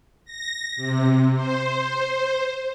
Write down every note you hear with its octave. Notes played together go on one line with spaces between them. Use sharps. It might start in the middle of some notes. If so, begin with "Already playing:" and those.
A#6
C3
C5